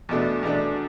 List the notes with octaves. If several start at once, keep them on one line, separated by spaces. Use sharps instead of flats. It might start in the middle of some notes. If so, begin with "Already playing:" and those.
E2 B2 A3 D4
E2 B2 A3 D4